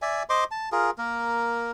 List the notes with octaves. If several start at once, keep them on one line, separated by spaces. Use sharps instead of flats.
D5 E5 G#5
C5 D#5 C6 D6
A5
F4 G#4 A#4
A#3 A#4